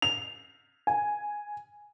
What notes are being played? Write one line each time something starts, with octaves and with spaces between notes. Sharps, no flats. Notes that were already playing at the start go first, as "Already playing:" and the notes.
F7
G#5